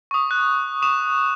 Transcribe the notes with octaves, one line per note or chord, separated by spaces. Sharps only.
C#6 D#6
F#6
C#6 D#6 E7